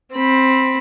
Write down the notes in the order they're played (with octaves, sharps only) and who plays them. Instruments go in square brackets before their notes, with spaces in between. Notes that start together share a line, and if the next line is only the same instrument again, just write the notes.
[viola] C4 B5